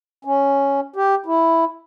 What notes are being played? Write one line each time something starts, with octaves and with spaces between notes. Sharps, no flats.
C#4
G4
E4